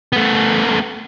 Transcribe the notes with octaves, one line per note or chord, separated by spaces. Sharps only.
A3 B3